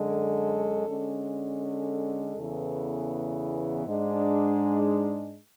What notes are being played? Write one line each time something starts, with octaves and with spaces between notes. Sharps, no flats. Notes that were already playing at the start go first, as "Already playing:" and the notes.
Already playing: F#2 D3 G#3
A4
D3 G#3 C#4
A4
E2 C#3 E3 B3
G#2 G#3 D4